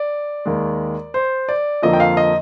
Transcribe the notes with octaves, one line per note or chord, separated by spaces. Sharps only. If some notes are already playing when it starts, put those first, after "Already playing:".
Already playing: D5
D#2 D#3 G#3
C5
D5
F2 D3 F3 A#3 D#5
G5
F5
D#5